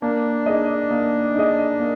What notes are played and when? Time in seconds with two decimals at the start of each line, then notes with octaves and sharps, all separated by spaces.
0.02 A#3 D4
0.46 D#4 G#4 D#5
0.91 A#3
1.35 D#4 G#4 D#5
1.80 A#3